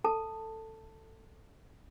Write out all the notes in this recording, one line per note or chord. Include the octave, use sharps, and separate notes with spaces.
A4 A5